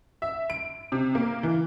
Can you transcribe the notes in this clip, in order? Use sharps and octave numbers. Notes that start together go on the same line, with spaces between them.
E5
D7
C3
A#3
E3